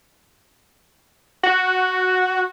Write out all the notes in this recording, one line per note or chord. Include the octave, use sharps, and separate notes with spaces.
F#4